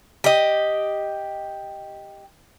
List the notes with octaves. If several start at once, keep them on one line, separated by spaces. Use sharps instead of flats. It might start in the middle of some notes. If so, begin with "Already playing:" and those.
G4 D#5